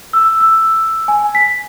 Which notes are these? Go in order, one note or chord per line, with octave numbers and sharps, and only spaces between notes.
E6
E6
G#5
B6